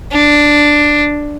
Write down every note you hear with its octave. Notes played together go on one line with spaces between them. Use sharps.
D4